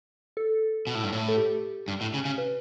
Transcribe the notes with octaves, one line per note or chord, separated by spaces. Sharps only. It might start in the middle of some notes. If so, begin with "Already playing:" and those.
A4
B2
A2
G2
A2
A4
G4
G2
A2
C#3
C#3
B4